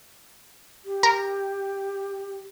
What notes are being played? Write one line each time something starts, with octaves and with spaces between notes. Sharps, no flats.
G4
A#4